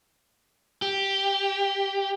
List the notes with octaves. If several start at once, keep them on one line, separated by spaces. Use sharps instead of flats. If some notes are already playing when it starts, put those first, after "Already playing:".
G4